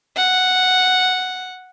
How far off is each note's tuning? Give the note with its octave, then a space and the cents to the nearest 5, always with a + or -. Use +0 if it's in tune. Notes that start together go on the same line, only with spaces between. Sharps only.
F#5 -5